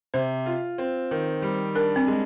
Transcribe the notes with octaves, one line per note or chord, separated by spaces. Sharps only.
C3 C5
F4
C4
D#3
G3
D4 A#4
C4
G#3